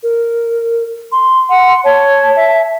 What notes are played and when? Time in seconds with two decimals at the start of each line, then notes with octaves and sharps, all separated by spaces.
0.03 A#4
1.12 C6
1.50 F#5
1.84 C#5 A5
2.36 E5